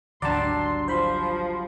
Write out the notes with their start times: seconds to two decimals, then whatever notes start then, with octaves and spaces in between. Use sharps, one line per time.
0.22 G#1 D2 F#3 G3 D4 D5 A5 C6
0.88 F3 C5 B5 C6